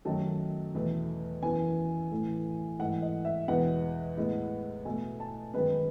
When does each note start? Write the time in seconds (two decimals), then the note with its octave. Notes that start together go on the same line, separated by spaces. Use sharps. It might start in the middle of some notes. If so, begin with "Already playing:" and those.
0.05 F#2 D#3 F#3 A3 A5
0.75 E2 B2 A3
1.42 F#2 E3 B3 G#5
2.12 A2 E3 A3
2.79 G#2 E3 A3 F#5
3.02 D#5
3.25 E5
3.48 E2 B2 G#3 B3 F#5
4.17 A2 G#3 B3
4.85 B2 A3 G#5
5.20 A5
5.53 F#2 D#3 G#3 B3 B4